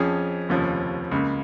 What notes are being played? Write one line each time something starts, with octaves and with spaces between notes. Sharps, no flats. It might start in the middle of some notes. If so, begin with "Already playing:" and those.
Already playing: F2 F3 C#4 G#4
F1 D#2 C#3 F3 C#4
C#2 C#3 A#3